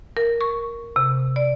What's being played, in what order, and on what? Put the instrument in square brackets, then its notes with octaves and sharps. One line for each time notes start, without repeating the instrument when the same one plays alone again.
[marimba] A#4
C#6
C3
D5